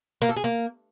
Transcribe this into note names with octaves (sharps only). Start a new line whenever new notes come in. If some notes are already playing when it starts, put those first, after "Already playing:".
A#3
A4
G#4
A#3